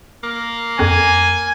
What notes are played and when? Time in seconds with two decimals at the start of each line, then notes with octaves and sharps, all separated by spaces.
0.23 A#3
0.79 F2 G#5